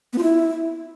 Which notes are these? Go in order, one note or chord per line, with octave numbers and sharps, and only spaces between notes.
B3
F4
E4